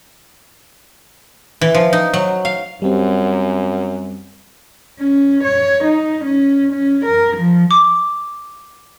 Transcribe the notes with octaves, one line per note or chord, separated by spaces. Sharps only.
E3
F3
D#4
F#3
F5
F#2 G3 C4
C#4
C#5
D#4
C#4
C#4
A#4
F3
D6